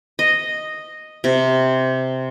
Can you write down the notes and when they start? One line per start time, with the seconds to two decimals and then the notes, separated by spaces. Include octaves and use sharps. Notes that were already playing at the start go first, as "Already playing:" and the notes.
0.19 D#5
1.24 C3